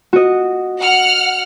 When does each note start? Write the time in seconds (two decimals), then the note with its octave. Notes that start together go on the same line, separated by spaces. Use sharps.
0.13 F#4 D#5
0.79 F#5 F6